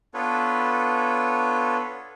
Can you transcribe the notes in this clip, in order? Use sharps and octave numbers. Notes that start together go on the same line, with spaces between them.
B3 D4 F4 A4 B4 C#5